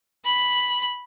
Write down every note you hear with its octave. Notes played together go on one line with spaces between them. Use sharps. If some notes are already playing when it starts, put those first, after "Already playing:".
B5